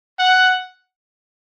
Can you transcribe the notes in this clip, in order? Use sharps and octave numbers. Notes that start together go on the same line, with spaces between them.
F#5